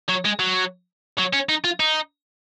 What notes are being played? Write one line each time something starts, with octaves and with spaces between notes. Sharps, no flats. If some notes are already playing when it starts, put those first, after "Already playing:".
F#3
G#3
F#3
F#3
C#4
D#4
F4
D#4